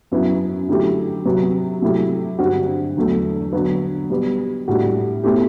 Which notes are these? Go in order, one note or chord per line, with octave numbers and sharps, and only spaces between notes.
F#2 F#3 B3 E4
D3 F#3 A3 E4 G4
C3 F#3 B3
C3 F#3 A3 E4 G4
G2 D3 G3 C4 F#4
E2 D3 F#3 A3
D3 F#3 B3
B2 G3 B3
A2 G3 D4 F#4
B2 A3 C4 E4 G4